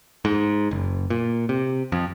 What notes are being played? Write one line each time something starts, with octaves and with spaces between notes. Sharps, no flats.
G#2
F#1
A#2
C3
F2